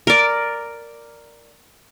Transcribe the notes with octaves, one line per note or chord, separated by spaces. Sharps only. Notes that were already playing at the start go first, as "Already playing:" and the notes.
A#4 D5